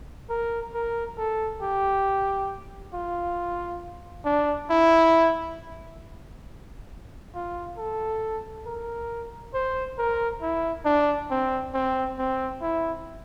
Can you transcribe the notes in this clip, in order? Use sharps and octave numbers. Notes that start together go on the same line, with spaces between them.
A#4
A#4
A4
G4
F4
D4
E4
F4
A4
A#4
C5
A#4
E4
D4
C4
C4
C4
E4